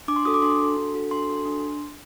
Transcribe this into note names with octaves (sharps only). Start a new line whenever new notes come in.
D4 D6
C6
F#4 A4 D#6
D6
D4 C6
F#4 A4
D4
F#4 A4
D4 C6
F#4 A4
D4